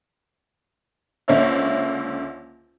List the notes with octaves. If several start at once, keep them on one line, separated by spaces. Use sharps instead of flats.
C#2 D3 A#3 C5 C#5 E5